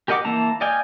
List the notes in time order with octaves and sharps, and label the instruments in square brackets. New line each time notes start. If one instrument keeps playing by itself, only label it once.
[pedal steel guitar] G4 A#4 D#5 F#5 D6
E3 A#3 E4 A5 A#5
D5 D#5 F5 G5 G#5